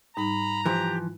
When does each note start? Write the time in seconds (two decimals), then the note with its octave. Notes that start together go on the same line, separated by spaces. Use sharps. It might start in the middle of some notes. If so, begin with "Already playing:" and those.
0.17 G#2 G3 D#4 A#5 B5
0.66 E3 F3 G4 B5